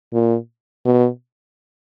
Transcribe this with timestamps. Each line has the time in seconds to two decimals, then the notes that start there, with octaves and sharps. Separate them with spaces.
0.13 A#2
0.86 B2